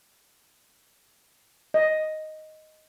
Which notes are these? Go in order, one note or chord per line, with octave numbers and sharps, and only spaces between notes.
D#5